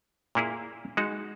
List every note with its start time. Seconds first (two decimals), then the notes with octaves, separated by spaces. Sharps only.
0.35 A#2 A#3 E4 G#4
0.97 G#3 D#4 F#4